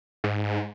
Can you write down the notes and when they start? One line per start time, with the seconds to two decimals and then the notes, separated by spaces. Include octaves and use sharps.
0.24 G#2